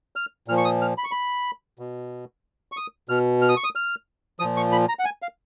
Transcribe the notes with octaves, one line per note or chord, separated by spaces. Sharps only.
F6
A#2 F3 F6
C#6
D#6
F6
B5
C#6
B5
B2
C#6
D#6
B2 F6
F6
D#6
C#6
D#6
F6
A#2 F3 D#6
C#6
B5
A#5
F#5
G#5
F5